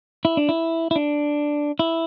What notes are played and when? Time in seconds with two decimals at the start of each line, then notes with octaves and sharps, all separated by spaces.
0.25 E4
0.37 D4
0.49 E4
0.91 E4
0.96 D4
1.79 E4